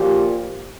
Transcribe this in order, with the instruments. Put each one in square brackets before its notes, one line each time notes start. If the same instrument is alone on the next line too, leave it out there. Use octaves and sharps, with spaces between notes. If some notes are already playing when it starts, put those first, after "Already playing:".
Already playing: [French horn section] A#2 F3 G4